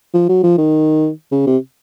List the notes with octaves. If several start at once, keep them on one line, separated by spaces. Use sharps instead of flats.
F3
F#3
F3
D#3
C#3
C3